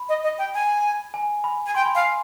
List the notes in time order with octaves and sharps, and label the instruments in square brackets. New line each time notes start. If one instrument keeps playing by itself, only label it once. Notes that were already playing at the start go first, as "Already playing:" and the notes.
Already playing: [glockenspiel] B5
[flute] D#5
D#5
G5
G#5
[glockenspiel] G#5
B5
[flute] G#5
[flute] G5 [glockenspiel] C6
[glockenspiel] B5
[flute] F5 [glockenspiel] G#5